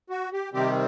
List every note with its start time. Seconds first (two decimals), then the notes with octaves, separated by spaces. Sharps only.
0.10 F#4
0.33 G4
0.53 C3 D#3 G3 C4 G4